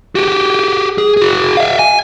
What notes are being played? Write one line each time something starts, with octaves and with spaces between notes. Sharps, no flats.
F#4 G4
G#4
F#4 G#4
E5 F5
G#5